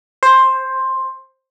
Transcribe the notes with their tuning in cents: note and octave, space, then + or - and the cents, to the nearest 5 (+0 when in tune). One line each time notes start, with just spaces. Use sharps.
C5 +10